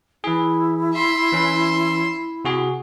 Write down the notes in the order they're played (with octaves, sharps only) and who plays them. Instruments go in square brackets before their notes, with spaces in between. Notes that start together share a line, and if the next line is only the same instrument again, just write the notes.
[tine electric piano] E3 G#4 [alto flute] E4
[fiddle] E5 C6
[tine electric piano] E3 C#4
C3 F#4 G#4